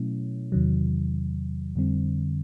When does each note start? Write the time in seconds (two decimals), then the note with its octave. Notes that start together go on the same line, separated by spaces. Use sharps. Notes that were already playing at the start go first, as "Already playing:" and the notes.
Already playing: B2 F#3 A3 C#4 E4
0.52 E2 C3 D#3 F#3
1.76 F2 D3 G3 C4